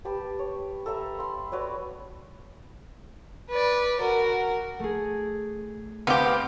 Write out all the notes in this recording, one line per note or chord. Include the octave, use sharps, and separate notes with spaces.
G4 B4 A5
C#5
A4 B4 E5 A#5
B5 C6
F#4 B4 C#5 D5
B4 D5
F#4 A#4
A3 G#4
D2 B3 C4 G4 F5